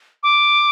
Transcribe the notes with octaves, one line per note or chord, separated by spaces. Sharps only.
D6